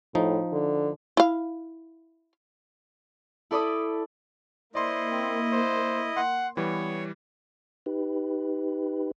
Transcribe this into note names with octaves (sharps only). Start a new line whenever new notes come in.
A2 F3 D#4
D3
E4 F5
E4 A4 D5 B5 D6 D#6
A#3 E4 C5 D5 D#5 C6
C4
C5
F#5 C6
E3 G3 B3 C#5
D#4 G4 B4